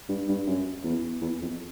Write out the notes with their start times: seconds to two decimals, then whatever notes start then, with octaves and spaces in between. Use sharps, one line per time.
0.09 G2
0.28 G2
0.47 F#2
0.84 E2
1.21 E2
1.41 F2